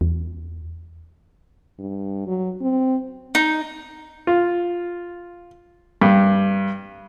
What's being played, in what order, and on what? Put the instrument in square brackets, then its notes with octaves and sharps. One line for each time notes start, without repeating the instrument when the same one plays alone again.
[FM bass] E2
[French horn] G2
F#3
C4
[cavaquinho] D#4
[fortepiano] F4
G2